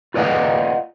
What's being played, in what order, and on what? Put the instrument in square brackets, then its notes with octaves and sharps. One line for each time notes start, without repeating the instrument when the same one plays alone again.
[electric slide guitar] F4 B4 D5 D#5 F5 F#5